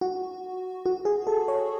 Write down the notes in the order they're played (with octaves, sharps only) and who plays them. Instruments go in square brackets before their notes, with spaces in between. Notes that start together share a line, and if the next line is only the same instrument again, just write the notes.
[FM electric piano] F#4
F#4
G#4
A4
C#5